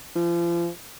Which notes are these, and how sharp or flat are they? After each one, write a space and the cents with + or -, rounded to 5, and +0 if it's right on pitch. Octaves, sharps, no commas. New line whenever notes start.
F3 -35